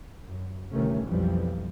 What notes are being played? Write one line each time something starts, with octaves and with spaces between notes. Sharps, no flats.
F#2
G1 C2 C3 D#3 A3 C#4
B1 F2 E3 F3 G3